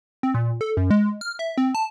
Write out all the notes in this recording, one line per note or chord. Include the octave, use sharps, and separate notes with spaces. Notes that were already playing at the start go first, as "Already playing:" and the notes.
C4
A#2
A4
F#2
G#3
F6
E5
C4
A5